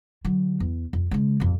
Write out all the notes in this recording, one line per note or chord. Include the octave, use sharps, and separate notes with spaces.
D3 F#3
E2
F2
C#3 G#3
A1 F2